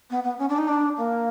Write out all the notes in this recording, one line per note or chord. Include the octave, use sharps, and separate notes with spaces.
B3
B3
C#4
D4
D#4
D4
A#3